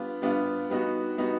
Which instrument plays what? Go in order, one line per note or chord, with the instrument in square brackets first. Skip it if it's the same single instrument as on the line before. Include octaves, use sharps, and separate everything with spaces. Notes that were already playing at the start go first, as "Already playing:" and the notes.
Already playing: [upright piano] G3 B3 D4 F4
G3 B3 D4 F4
G3 B3 D#4 F#4
G3 B3 D#4 F#4